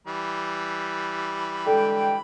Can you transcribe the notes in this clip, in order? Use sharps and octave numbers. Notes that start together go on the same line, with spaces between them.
E3 G3 B5
D3 G#3 A4 G5